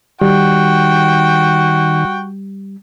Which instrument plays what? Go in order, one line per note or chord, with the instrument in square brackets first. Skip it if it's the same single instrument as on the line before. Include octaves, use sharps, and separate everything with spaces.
[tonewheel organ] D#3 [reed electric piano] G3 [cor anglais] F#4 [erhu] G5